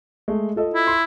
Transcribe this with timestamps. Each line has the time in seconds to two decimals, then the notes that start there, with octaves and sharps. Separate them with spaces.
0.28 G#3 A3
0.56 F4 A4 D#5
0.74 E4
0.87 C6